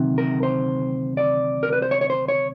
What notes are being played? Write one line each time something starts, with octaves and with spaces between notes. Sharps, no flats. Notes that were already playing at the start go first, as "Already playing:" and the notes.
Already playing: D2 C3 D#3 F#3
A#4
C5
D5
A#4
B4
C5
C#5
C#5
C5
C#5